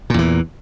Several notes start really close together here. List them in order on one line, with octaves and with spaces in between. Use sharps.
A#2 E2 E3